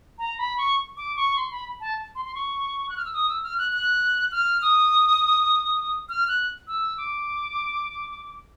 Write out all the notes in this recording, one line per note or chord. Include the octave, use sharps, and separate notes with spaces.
A#5
B5
C#6
D6
C#6
C6
B5
A5
C6
C6
C#6
F#6
F6
E6
D#6
E6
F6
F#6
F#6
F6
D#6
F6
F#6
E6
D6